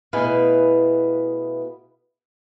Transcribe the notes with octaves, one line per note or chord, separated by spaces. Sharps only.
B2 A3 E4 G#4 B4 F5